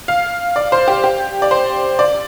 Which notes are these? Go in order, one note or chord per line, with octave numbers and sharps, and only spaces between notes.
F5
D5
C5
G4
G4
D5
C5
D5